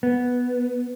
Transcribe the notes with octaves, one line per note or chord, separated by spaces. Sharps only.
B3